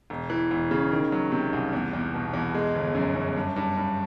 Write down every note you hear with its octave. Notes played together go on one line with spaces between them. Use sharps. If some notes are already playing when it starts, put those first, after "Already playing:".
E1
E3
E1
C#3
D#3
F#3
C3
C2
E2
E2
B2
E2
G#3
G1
F#2
F#2
G2
G2
G2